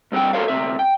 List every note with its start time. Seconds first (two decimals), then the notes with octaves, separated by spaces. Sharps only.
0.12 G2 C4 F#4 F#5 G5
0.33 F#4 A4 A#4 C5 C#5 F5
0.48 D2 C3 E5
0.79 G5